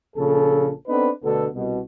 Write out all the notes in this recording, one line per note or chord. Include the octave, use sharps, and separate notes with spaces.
A#1 A#2 C#3 A4
B3 C4 D4 D#4 A4 B4
D2 B2 D3 B3 A4
C2 B2